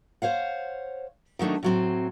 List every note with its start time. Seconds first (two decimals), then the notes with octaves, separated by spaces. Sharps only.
0.22 C5 C#5 F5 F#5
1.39 D#3 F#3 A3 D4 D#4
1.63 A2 F#3 C4